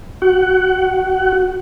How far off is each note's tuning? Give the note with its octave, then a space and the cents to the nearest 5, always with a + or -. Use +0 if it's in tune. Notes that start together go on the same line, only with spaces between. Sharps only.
F#4 +0 F#5 +25